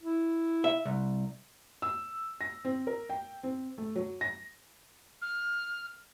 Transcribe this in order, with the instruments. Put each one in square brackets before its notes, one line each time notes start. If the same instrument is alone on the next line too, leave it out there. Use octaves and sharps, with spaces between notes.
[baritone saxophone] E4
[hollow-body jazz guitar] E5
C2
[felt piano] E6
A#6
C4
A#4
G5
C4
A3
F#3
A#6
[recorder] F6